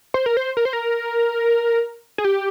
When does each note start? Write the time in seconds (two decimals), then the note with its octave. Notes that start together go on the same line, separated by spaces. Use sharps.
0.14 C5
0.26 A#4
0.37 C5
0.57 A#4
0.65 C5
0.73 A#4
2.18 G#4
2.24 G4